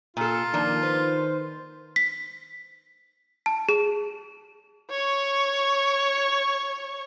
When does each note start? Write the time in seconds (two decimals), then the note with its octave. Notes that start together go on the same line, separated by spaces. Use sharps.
0.17 A#2 F4 A4
0.54 D#3 F3 A#3 D4
0.83 B4 C5
1.96 B6
3.46 A5
3.69 G#4
4.90 C#5 C#6